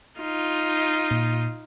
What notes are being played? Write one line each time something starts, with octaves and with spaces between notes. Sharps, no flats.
D#4 F4
A#2